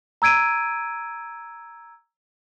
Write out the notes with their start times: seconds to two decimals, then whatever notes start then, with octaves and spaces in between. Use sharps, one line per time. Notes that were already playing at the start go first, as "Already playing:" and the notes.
0.22 A#5 E6 G#6 D7 D#7